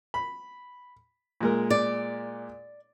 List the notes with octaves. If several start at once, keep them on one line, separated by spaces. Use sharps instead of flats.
B5
A#2 G#3 A#4
D5